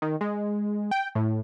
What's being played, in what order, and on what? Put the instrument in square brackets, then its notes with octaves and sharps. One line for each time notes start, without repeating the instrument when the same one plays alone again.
[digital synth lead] D#3
G#3
G5
A2